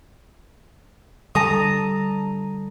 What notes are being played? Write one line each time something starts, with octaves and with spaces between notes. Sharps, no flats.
D3 G3 A4 A5 A#5 D#6